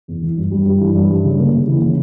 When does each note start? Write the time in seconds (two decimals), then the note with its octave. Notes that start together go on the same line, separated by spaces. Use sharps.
0.08 E2
0.22 E3
0.37 G2
0.51 G3
0.66 G2
0.80 E3
0.95 G2
1.09 G3
1.24 C#3
1.39 A#3
1.53 C#3
1.68 E3
1.81 C#3